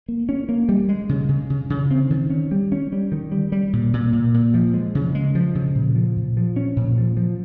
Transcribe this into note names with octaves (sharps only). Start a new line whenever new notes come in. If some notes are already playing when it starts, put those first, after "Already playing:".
A#3
C#4
A#3
G3
G#3
C#3
C#3
C#3
C#3
C4
D#3
C#4
G3
C#4
G3
D#3
G3
G3
A#2
A#2
A#2
A#2
F3
G#3
C#3
G#3
F3
C#3
A#2
F3
A#2
F3
C#4
A#2
F3
F3